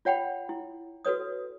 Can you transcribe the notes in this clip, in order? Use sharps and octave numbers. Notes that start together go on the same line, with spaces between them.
F4 C#5 F#5 G5 B5
E4
F#4 A4 B4 C#5 D#6